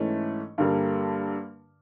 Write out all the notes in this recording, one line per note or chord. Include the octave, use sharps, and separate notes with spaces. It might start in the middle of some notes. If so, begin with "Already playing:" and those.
Already playing: G#2 E3 A3 C#4
G2 D3 G3 A#3